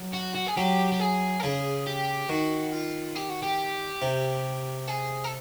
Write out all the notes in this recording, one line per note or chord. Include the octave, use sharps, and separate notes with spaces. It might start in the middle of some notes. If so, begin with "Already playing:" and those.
Already playing: F#3
F#4
F#4
G#4
F#3 G4
G4
G#4
A4
C#3 G#4
G4
D#3 F#4
F4
G4
F#4
G4
C3
G#4
A4